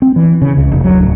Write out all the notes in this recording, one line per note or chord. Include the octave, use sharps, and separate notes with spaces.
C4
E3
C#3
C#2
F1
F#3
D1